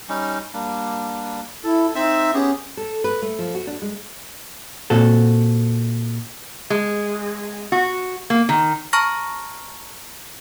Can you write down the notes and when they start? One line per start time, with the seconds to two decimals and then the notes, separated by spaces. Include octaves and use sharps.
0.09 G3 C#4 D#4
0.54 G3 A#3 D4
1.64 E4 A4
1.95 C4 D#4 E5 E6
2.34 B3 C#4 G4 G#4
2.77 A4
3.04 B4
3.22 A3
3.39 F3
3.55 F#4
3.67 D4
3.82 G#3
4.90 A#2 C4 F#4 A4
6.70 G#3
7.72 F#4
8.30 A#3
8.49 D#3
8.93 A5 A#5 C#6 F6 A#6